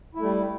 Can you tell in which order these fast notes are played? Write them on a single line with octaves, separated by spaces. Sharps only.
E4 A3 G3